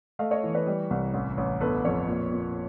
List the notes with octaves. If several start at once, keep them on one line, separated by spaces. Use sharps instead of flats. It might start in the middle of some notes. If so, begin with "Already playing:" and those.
A3 D#5 F5
C#5 D#5
E3
B4 C#5
G3
C2
A1
A1
G1 A4 B4
F2 B4 C#5
A#2
A#2